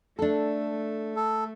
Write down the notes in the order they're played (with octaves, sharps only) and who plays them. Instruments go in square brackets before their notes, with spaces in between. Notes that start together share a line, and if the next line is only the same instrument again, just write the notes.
[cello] A3 [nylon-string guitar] D4 A4
[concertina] A4